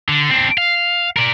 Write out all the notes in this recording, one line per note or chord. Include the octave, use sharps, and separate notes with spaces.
D3
C4 D4
F5
A#4 D5